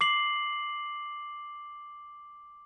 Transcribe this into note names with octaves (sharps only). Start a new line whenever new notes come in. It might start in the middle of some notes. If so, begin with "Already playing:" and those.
D6 C7 F#7